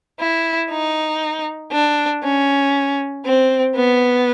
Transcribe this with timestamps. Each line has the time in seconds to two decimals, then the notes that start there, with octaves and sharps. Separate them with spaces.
0.20 E4
0.70 D#4
1.72 D4
2.23 C#4
3.25 C4
3.76 B3